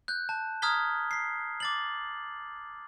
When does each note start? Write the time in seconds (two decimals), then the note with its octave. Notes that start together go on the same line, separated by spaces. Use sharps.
0.08 F#6 G6
0.29 A5
0.62 A#5 D#6 F6 G#6 B6 G7
1.11 B6 C7
1.60 D6 A6 F#7